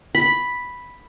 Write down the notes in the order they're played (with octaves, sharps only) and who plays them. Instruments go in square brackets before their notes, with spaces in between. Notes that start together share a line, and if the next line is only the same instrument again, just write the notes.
[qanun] B5